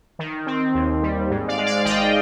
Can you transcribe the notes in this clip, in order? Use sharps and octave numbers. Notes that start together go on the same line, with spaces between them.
D#3
C4
D#2
G3
G#2
D5 F5
G#3
D5 F5
G#1 D#5 G5